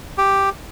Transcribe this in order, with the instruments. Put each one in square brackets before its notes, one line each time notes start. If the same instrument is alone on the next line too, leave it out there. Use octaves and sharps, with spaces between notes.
[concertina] G4